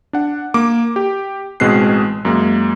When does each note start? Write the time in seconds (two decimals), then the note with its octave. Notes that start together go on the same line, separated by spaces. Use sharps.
0.13 D4 F#5
0.54 A#3 D6
0.96 G4
1.60 A1 B2 G#3 C4 F#6 C7
2.25 F#2 G#3 A#3